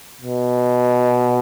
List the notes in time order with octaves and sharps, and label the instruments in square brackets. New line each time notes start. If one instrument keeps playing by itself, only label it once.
[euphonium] B2